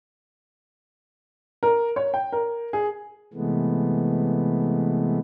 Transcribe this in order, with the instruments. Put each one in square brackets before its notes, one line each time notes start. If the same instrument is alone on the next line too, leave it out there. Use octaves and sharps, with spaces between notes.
[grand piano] A#4
C#5
G5
A#4
G#4
[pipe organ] C3 E3 G#3 A3 B3